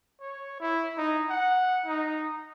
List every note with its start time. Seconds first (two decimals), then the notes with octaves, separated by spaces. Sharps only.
0.21 C#5
0.60 E4
0.97 D#4
1.30 F#5
1.86 D#4